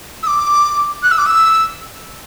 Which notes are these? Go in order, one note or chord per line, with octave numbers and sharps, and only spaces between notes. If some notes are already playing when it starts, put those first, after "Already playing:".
E6
D6
F#6
E6
D6
E6